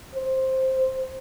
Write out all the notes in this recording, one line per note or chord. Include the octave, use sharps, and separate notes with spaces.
C5